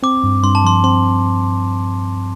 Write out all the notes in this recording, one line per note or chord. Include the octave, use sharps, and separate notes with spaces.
C4 D6
G2
G2 C6
A5
F3 C6
C4 C6